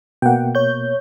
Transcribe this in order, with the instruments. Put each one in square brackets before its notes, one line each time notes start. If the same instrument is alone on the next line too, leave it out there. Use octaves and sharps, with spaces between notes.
[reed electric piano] B2 A#3 [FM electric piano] F#5 G5
[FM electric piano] C#5 G6